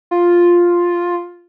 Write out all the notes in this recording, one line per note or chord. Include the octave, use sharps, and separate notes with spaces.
F4